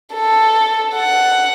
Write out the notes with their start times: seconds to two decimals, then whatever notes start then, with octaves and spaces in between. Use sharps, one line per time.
0.14 A4
0.95 F#5